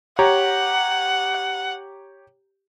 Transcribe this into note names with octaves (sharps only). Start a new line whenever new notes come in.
G4 C#5 F#5 A#5